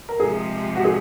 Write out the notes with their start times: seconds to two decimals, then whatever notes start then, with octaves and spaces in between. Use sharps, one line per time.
0.09 A#4
0.20 C3 F3 G#3 G#4
0.76 F#4
0.84 G#4